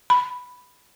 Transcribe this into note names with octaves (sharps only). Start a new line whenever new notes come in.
B5